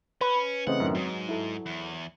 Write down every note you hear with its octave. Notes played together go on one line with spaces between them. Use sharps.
C#4 B4
C#3 E3 A3 C4 C5 D#5 F#5
F#2 A2 D#3
G#2 F#3
E4 A4
E2